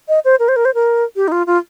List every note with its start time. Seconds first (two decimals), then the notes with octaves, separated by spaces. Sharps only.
0.08 D#5
0.25 C5
0.39 A#4
0.48 C5
0.56 A#4
0.65 C5
0.74 A#4
1.16 G4
1.28 D#4
1.32 F4
1.47 F4